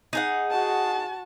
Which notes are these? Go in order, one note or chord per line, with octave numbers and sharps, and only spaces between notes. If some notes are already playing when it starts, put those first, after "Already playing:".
D#4 G#4 F#5
F#4 A5